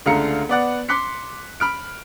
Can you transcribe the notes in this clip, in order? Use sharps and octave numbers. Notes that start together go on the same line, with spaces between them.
C#2 D3 A3 F5 A#5 C#7
B3 D5 F#5
C6 D6 F#6 B6 C#7
B5 F6 D7